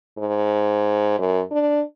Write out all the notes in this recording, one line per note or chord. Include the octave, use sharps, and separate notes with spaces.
G#2
F#2
D4